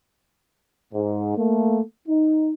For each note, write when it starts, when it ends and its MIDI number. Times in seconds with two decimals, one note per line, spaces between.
0.93 1.36 44
1.37 1.80 57
1.37 1.80 58
2.08 2.52 63